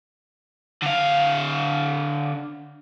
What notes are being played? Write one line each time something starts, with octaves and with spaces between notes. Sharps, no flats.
D3 F5